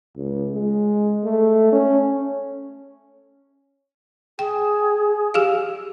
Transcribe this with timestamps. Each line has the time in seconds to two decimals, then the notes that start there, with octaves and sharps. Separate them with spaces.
0.16 C#2
0.54 G#3
1.24 A3
1.72 C#4
4.39 G#4 G5
5.34 G4 G#4 F5